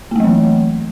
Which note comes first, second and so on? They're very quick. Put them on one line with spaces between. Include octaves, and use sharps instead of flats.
A#3 A3 F#3 E3